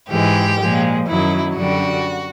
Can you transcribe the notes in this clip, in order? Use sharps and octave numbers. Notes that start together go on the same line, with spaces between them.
G#2 E3 G#3 G4
A#2 F3 G#3
F#2 D#3 F#3 E4
F#2 D3 G3 F#4